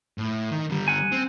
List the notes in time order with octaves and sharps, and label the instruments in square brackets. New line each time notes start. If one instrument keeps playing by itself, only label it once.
[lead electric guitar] A2
D#3
D3 G3
[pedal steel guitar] F#5 G#5
[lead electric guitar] C4